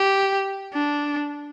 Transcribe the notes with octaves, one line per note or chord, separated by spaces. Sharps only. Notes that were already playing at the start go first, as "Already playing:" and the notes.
Already playing: G4
D4